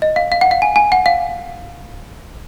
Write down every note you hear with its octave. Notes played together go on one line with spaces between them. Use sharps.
D#5
F5
F5
F#5
F5
G#5
G#5
F#5
F5